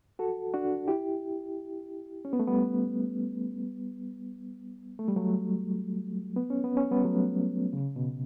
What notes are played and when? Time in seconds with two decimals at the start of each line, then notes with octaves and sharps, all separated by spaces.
0.19 F#4 A4
0.54 D4 F#4
0.88 E4 G4
2.25 C#4
2.33 B3
2.39 A3
2.47 G3 B3
4.99 A3
5.08 G3
5.16 F#3 A3
6.36 B3
6.50 C#4
6.64 B3
6.77 C#4
6.91 G3 B3
7.04 F#3 A3
7.73 C#3
7.96 B2